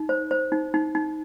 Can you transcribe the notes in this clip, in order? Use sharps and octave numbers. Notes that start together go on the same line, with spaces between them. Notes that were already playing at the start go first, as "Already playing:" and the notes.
Already playing: D#4
C5
C5
D#4
D#4
D#4